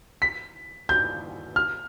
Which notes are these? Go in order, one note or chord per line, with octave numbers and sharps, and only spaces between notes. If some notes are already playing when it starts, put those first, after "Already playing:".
B6
G6
F6